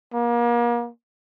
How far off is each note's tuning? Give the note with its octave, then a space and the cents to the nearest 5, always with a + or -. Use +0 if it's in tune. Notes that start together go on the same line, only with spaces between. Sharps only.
A#3 +35